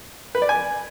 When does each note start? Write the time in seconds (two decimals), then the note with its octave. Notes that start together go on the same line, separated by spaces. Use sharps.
0.35 B4
0.42 D5
0.49 G#5